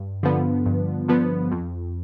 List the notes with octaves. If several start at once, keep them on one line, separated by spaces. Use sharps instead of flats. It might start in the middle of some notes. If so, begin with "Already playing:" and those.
Already playing: G2
D3 F3 B3
G2
D3 F3 B3
F2